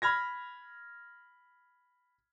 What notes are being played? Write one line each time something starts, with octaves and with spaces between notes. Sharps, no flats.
B5 F6 G#6 A#6